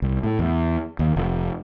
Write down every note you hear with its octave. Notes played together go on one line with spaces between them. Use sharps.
C2
A2
E2
D#2
F1